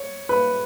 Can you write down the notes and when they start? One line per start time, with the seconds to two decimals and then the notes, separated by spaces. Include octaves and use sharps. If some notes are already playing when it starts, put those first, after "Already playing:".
Already playing: C#5
0.29 B4